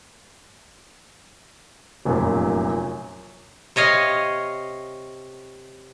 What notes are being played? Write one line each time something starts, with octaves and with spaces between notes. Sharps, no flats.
F1 F#2 A#2
C3 C#5 D#5 F5